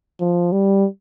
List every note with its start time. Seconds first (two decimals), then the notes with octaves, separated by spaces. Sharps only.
0.20 F3
0.52 G3